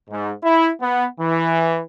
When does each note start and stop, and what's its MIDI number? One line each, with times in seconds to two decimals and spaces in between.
0.10 0.32 44
0.43 0.69 64
0.81 1.05 59
1.19 1.80 52